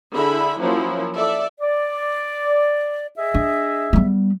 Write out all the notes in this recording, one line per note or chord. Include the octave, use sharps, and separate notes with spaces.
D3 E4 G#4 E5 B5
F3 F#3 A#3 C#4 E4
A4 D5 E5
D5
G#4 D#5 E5
D4
G3 B3